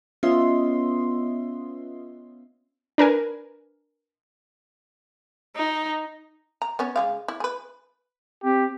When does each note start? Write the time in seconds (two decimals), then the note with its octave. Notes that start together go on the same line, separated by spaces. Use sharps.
0.23 B3 C#4 F4 D#5 E5 C6
2.98 D4 A#4 B4 G#5
5.56 D#4
6.62 A#5
6.79 B3 C#4 C#5
6.96 C#3 G#3 F5
7.28 E4
7.40 G#4 B4
8.44 C4 G4